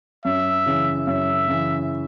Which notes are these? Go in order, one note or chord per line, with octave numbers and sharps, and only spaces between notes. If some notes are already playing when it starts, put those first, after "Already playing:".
F#2 E5
C#3 E3
F#2 E5
C#3 E3